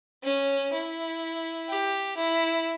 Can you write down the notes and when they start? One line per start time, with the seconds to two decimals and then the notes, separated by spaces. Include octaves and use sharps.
0.24 C#4
0.73 E4
1.68 G4
2.16 E4